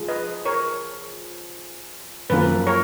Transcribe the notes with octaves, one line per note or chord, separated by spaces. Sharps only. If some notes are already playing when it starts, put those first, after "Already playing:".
Already playing: F3 G#3
B4 D#5
A#4 C#5
F#2 F3 A#3 B4
A#4 C#5